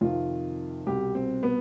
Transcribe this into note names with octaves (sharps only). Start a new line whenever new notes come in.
F2 C3 D#3 F4
C2 B2 G4
C4
B3